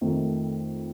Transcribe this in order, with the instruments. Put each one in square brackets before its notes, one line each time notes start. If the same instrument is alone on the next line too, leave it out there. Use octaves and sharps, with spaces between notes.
[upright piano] F2 D#3 A3